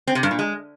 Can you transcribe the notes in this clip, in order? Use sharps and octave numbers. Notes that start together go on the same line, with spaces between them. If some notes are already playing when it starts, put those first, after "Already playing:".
C4
C3
G2
A#2
G#3